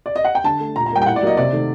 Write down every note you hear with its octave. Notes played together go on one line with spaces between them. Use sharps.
D5
D#5
F#5
G5
D3 A5
A3
A#2 A#5
A#5
G3 A#3 G5
G5
A2 F#5
D5
F#3 A#3 D#5
C3 D5
D#3 A3